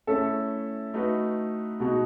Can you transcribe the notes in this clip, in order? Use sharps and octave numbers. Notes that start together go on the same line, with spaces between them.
A3 C#4 E4 A4 E5
A3 D#4 F#4 B4
B2 G#3 D#4 F#4